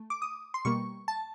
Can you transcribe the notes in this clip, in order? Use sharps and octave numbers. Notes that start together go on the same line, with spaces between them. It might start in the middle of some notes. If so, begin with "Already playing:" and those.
Already playing: A3
D6
D#6
C6
B2 G3 A#3 C#6
A5